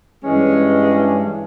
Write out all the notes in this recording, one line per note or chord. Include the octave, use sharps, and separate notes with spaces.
G2 E3 G#3 C#4